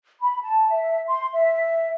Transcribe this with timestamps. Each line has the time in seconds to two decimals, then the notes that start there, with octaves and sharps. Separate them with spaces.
0.21 B5
0.41 A5
0.70 E5
1.07 C6
1.33 E5